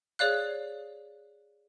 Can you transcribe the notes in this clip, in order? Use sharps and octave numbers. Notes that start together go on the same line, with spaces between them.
G#4 C#5 D5 F5 F#6